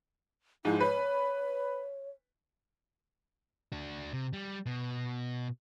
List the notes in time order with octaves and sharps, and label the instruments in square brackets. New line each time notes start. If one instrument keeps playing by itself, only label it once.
[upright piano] G#2 F3 G#3 [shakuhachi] E4
[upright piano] B4 [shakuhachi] C#5
[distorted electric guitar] D4 F#4
C3
G3
B2